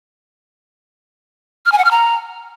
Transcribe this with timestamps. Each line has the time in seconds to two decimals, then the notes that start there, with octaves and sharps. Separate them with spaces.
1.66 F6
1.72 G#5
1.78 F#5
1.85 F6
1.91 A#5